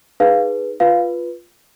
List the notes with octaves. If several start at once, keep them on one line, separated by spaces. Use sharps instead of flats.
D#4 G#4 B4 F5
F4 B4 F5